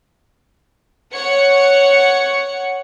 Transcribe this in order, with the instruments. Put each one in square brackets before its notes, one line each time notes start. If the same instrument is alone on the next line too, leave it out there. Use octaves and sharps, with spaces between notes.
[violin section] C#5 F#5 C#7